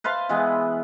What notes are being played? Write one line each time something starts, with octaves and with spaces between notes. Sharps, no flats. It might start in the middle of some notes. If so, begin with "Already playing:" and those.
B4 C5 F5 A5
E3 G#3 B3